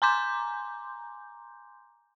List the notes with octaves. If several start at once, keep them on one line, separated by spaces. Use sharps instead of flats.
G#5 A#5 C6 D6 G6